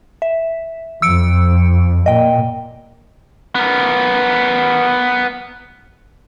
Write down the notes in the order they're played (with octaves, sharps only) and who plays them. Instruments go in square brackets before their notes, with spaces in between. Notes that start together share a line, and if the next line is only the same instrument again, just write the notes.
[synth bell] E5
[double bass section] F2 [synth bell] E6 C#7 D7
[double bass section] A#2 [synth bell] D#5 G5
[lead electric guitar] B3 A#4